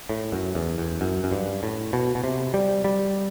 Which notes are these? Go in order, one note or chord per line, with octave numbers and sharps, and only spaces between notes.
A2
F#2
E2
E2
F#2
F#2
G2
A2
B2
B2
C3
G3
G3